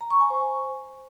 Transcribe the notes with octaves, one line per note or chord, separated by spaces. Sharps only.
A#5
C#6
G#5
C5